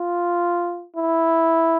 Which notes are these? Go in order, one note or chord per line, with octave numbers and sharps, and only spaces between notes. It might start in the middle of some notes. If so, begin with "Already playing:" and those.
Already playing: F4
E4